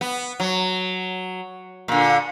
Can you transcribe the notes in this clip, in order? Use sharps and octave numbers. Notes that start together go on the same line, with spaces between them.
B3
F#3
A#2 D3